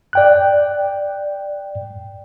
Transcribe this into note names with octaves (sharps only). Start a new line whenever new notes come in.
D5 G5 F#6